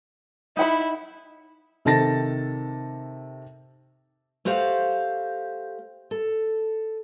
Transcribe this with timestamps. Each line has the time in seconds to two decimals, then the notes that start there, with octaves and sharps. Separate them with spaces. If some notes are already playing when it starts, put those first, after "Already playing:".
0.57 D#4 E4 F#5 B5
1.85 C3 D#3 A4 A5 A6 A#6
4.45 A3 F#4 G4 C5 F5
6.11 A4